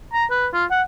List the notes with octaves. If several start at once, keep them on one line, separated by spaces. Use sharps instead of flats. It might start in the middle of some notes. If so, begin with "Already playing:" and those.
A#5
B4
F4
F#5